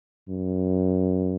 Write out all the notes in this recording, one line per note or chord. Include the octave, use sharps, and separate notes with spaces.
F#2